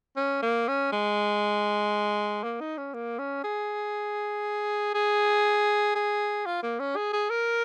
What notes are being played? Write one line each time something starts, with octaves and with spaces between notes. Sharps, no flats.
C#4
A#3
C#4
G#3
A#3
D#4
C#4
A#3
C#4
G#4
G#4
G#4
F4
A#3
C#4
G#4
G#4
A#4